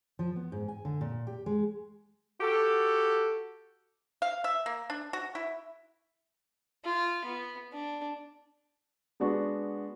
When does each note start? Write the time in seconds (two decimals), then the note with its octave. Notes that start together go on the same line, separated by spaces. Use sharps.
0.19 F3
0.36 B3
0.52 G#2
0.68 G#5
0.85 D3
1.01 A#2
1.27 G4
1.46 G#3
2.41 F#4 G4 A4
4.22 F5
4.44 E5
4.66 A#3
4.90 D4
5.13 F#4
5.35 E4
6.85 F4
7.25 B3
7.72 D4
9.20 G#3 B3 D4 F#4